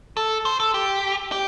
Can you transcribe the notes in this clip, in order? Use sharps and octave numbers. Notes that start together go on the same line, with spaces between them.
A4
C5
A4
G4
G4